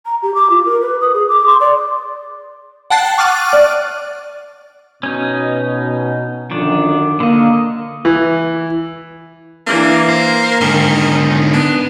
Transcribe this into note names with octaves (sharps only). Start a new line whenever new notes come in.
A#5
G4
D6
F4
A#4
B4
D#6
G#4
D6
C6
D5
F#5 G5 A5 F#6 A6 C7
C#6 D6 F6 F#6 A6 D#7
D5
B2 C#4 D#4
F#2 D3 D#3 F3 D4
D3 A#3 D#5
E3
E3 A#3 D4
A#4 C5
G#2 D3 D#3
D#4
B3 D4